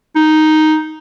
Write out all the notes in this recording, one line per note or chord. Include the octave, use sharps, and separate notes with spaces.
D#4